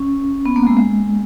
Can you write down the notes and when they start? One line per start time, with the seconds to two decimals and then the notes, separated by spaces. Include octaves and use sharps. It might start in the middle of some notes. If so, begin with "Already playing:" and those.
Already playing: C#4
0.46 B3
0.56 A#3
0.67 G#3
0.77 G#3